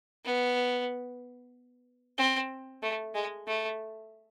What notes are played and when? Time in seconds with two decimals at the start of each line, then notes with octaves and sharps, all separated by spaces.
0.25 B3
2.18 C4
2.83 A3
3.15 G#3
3.47 A3